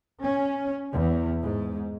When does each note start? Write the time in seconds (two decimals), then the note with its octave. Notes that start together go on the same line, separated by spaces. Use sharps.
0.24 C#4
0.92 E2
1.43 G#2